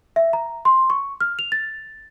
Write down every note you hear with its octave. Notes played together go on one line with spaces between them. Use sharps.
E5
A#5
C6
C#6
F6
F7
A6